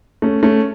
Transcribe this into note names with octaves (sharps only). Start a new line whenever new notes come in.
A3 C#4
A3 C#4